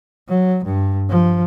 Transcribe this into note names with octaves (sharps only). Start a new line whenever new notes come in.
F#3
G2
F3